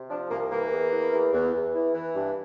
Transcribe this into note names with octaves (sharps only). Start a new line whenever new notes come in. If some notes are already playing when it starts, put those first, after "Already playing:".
Already playing: C3
F3 D4
C2 A#3
E3 A#3
E2
E3
E2
E2
E2
E3
E3
G2